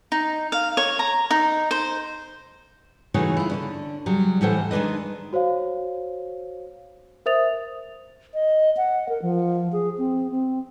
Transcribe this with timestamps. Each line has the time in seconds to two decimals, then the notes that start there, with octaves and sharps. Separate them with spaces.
0.12 D#4
0.52 F5
0.77 C#5
0.99 A#5
1.31 D#4
1.71 C5
3.14 C#3 E3 A3 D#4 F#4 C#5
3.37 E4 F4
3.49 D3 C#4 D4
4.06 C#3 F#3 G3
4.41 A2 E3 C#4 A4 C5 F#5
4.71 D#3 G#3 D4 B4 D#5
5.33 F#4 C5 C#5 F5
7.26 A#4 C5 E5 D#6 A6 F7
8.34 D#5
8.77 F#5
9.09 A#4
9.22 F3
9.73 G#4
9.98 C4
10.31 C4